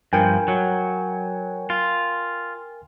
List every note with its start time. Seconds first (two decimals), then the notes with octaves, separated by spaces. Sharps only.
0.13 G2 F3 A#4 G5 G#5
0.48 F#3
1.70 F4